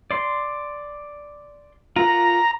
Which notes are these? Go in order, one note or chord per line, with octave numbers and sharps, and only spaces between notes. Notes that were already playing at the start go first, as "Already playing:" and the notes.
D5 C6
F4 A#4 F#5 A#5